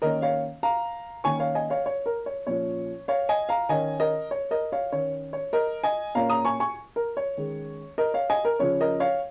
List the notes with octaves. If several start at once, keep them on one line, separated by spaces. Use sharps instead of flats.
D#3 A#3 C#4 A#4 D#5
C#5 F5
F5 A#5
D#3 A#3 C#4 G#5 C#6
C#5 F5
D#5 G#5
C#5 F5
C#5
A#4
C#5
A#2 F3 C#4 C#5
C#5 F5
D#5 G#5
F5 A#5
D#3 C#4 D#5 G#5
A#4 D#5
C#5
A#4 D#5
C#5 F5
D#3 C#4 C#5
C#5
A#4 D#5
D#5 G#5
A#2 A#3 C#4 F5 A#5
A#5 D#6
G#5 C#6
G#5 C#6
A#4
C#5
D#3 G#3 C#4
A#4 D#5
C#5 F5
D#5 G#5
A#4
C#3 F3 C#4 C#5
A#4 D#5
C#5 F5